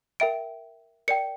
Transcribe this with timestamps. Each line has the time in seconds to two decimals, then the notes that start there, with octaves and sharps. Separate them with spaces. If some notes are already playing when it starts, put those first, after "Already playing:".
0.20 A#4 E5 G5 D7
1.08 A#4 D5 G5 C#7